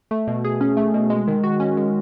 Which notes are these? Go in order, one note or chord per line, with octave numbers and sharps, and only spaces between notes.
A3
B2
G#4
C#4
A3
B2
G#3
D#3
F#4
C#4
G#3